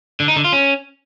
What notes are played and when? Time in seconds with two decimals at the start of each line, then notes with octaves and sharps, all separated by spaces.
0.20 D3
0.28 D#4
0.36 D3
0.44 F4
0.53 C#4